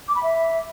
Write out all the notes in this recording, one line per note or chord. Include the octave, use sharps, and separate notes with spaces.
D6
B5
E5